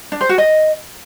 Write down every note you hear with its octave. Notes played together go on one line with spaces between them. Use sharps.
D4
C5
F#4
D#5